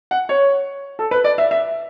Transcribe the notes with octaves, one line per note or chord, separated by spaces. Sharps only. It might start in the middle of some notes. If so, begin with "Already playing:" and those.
F#5
C#5
A4
B4
D5
E5
E5